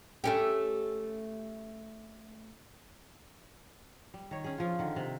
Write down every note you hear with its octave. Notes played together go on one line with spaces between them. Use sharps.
A3 C#4 G4
G3
D#3 C#5
C#4 G#4
F3 F4
D3 D#3
C3